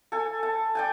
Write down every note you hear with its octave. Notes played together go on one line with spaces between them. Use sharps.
A4 G#5
A5
D5 G5 G#5